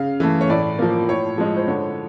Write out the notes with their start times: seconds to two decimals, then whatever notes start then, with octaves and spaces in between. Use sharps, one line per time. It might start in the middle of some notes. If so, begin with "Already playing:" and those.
Already playing: C#3 F5
0.20 E3 A3
0.41 C#5
0.50 A2 D5
0.79 F3 A#3
1.09 A2 C#5
1.38 F3 G#3
1.57 C5
1.68 D3 C#5